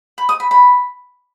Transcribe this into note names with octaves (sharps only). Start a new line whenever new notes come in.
B5
D#6
B5
B5